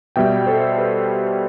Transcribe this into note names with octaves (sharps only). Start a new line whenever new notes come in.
B2 G3 E5 G5
A4 C5
G4 B4